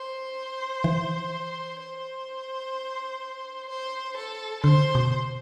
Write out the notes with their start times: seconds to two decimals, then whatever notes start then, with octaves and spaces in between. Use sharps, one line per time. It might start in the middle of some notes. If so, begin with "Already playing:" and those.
Already playing: C5
0.84 E3
1.79 C5
3.69 C5
4.16 A4
4.63 D3 C5
4.95 B2